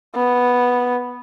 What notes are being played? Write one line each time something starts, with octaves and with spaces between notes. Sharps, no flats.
B3